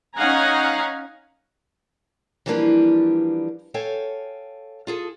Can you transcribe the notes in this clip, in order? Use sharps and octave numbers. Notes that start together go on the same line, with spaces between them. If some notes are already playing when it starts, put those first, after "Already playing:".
C#4 D#4 F5 F#5 G#5 A#5
E3 F3 G3 A#3 D4 B4
A4 C#5 F5 G5 G#5
F4 G#4 A4